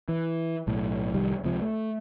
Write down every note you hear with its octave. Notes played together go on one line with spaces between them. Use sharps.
E3
B1 A2
C2 F2 D#3 G3
C#2 C3 F3
A3